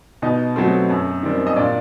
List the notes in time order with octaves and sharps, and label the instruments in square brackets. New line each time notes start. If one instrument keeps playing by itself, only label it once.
[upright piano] B2 D#4 D#5
F#3 A3 C4
F#2
D#3 G3 C4
D#5
A#2 D4 D5